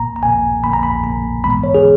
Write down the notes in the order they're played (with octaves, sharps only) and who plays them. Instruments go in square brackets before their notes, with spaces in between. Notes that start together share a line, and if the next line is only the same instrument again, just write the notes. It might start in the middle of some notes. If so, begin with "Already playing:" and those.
Already playing: [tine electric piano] A#1 A#2 A#3 A#5
A#5
A#1 A#2 A#3 G#5
A#1 A#2 A#3 B5
A#5
B5
A#1 A#2 A#3 A#5
G#2 E3 G#3 B3 B5
C#5
G#4